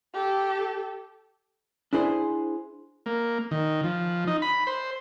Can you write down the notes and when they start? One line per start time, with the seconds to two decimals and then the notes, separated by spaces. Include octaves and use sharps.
0.14 G4 A4
1.93 D4 E4 G#4 C5
3.06 A#3
3.51 D#3
3.84 F3
4.27 D#4
4.42 B5
4.67 C5